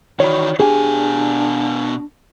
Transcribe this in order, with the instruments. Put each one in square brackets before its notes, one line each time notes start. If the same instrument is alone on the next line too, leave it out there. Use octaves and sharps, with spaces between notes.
[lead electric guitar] D#3 E3 [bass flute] F#4 [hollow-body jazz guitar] C#5 D5 B5
[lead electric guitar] B2 G#5 [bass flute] D4 [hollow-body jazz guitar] G4 G#4